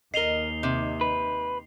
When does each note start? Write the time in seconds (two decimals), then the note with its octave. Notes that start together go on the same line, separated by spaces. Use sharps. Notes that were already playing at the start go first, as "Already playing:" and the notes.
0.14 D#2 D#4 A#4 D#5 C7 F7 G7
0.63 C3
1.01 B4